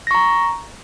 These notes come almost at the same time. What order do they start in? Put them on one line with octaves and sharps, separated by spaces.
A#6 C#6 A#5